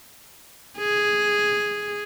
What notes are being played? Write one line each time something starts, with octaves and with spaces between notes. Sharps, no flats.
G#4